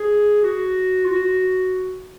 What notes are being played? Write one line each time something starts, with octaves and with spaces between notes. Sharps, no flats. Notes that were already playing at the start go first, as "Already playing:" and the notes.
Already playing: G#4
F#4
F4
F#4